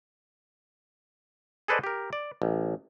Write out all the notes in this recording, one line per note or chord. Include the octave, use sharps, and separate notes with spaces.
G#4 A4 B4 C5 D5 D#5
G4 A#4
D5
A1